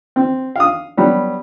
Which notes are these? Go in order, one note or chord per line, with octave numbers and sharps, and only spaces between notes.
C4
F5 D#6
F#3 G3 B3